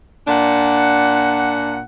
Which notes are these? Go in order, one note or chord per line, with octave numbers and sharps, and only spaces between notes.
A#2 D4 F#5